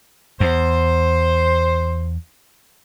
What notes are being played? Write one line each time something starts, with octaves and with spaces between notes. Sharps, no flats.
E2 C5